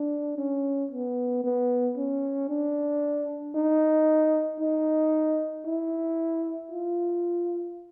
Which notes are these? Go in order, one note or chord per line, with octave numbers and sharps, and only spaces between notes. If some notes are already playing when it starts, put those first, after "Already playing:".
Already playing: D4
C#4
B3
B3
C#4
D4
D#4
D#4
E4
F4